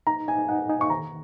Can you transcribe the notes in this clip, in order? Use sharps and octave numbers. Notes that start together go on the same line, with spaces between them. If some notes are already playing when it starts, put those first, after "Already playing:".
D#4 A#5
D#4 G#5
D#4 F#5
D#4 G#5
C#6
D#3 A#5